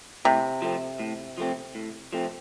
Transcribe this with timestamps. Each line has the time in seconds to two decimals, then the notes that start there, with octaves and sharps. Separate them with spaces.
0.25 A2 C3
0.62 F3 A3 C4
1.00 A2
1.38 F3 A3 C4
1.75 A2
2.13 F3 A3 C4